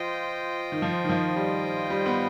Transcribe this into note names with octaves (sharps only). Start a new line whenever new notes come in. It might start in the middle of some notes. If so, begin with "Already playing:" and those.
Already playing: F3 F4 C5 D#5 G5
D#3
F3
D#3
F3
G3
G3
B3